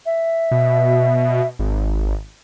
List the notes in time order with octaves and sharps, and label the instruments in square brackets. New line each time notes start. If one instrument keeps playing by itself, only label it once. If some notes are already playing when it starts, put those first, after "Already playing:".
[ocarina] E5
[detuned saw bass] B2
G#1